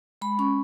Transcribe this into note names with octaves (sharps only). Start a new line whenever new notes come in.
G#3 B5
C#4 C#6